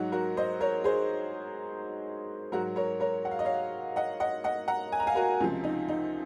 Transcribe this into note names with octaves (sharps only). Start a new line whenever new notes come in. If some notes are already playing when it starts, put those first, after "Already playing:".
Already playing: G#2 F#3 D#4 F#4
F#4 A#4
C5 D#5
A#4 C#5
G#4 C5
G#2 F#3 F#4 A#4
A#4 C#5
A#4 C#5
F#5
F5
D#5
C#5 F5
D#5 F#5
D#5 F#5
D#5 F#5
F#5 A#5
G#5
A#5
F5 G#5
F#4 A#4
C#2 C3 F3 F4
D#4
D#4